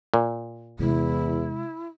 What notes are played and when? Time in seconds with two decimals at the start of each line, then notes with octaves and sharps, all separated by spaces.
0.14 A#2
0.79 E2 C3 G#3 E4